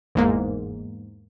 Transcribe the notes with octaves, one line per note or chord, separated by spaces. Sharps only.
G1 E2 G#2 A#3